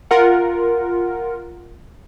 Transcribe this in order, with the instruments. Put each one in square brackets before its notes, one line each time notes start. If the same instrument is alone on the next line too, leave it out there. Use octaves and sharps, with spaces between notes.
[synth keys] F4 A#4 F#5